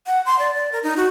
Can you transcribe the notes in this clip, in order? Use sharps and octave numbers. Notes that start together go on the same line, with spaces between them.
F#5
C6
D5
D5
A#4
D#4
F#4